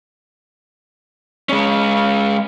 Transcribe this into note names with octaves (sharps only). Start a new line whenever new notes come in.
G#3 C#4